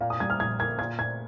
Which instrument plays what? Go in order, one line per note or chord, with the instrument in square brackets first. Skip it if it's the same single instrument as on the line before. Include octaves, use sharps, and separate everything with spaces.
[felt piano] A#2 [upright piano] F5
[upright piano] D#6
[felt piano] G3 [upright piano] G#6
[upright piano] F6
[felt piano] A#1 [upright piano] G#6
[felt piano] A#3 [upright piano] G#6
[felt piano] A#2 [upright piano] G#6
[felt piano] A#2 [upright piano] G#6